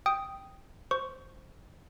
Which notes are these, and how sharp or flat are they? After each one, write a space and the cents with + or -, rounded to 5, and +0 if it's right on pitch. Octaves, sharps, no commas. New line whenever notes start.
G5 +0 D#6 +0
C5 +0 C#6 +10